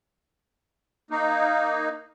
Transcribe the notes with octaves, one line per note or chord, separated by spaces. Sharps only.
A#3 D#4